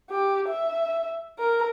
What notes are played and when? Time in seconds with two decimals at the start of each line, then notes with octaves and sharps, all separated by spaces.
0.10 G4
0.48 E5
1.39 A#4